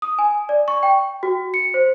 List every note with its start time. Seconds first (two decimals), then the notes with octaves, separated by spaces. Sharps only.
0.02 D#6
0.19 G#5
0.49 D5
0.68 C#6
0.83 G5
1.23 F#4
1.54 C#7
1.74 C5